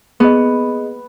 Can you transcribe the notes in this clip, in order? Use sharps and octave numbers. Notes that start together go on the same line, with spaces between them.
B3 G#4 D#5